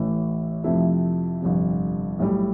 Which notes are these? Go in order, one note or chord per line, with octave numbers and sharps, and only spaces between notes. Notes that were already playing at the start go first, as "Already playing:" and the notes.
Already playing: A1 A2 E3
F2 C3 F3 A3 E4
G1 F2 C3
B1 A2 G3